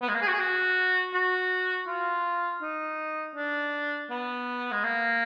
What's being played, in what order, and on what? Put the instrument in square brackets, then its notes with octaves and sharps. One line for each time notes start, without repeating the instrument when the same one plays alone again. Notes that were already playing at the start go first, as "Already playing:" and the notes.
[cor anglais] B3
G#3
A#3
G#4
F#4
G#4
F#4
F#4
F4
D#4
D4
B3
G#3
A#3